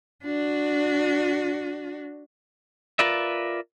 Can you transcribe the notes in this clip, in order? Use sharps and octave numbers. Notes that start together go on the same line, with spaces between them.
D4 F#4
F4 A#4 B4 D5 E5